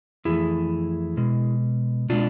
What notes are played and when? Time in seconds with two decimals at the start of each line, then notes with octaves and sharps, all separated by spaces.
0.25 F2 E3 A3 E4 G#4
1.17 B2 G#3
2.09 B2 G#3 D4 F4